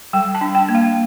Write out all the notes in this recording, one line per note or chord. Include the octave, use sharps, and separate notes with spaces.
G3 G5
A5
D4
G5
A#3
F5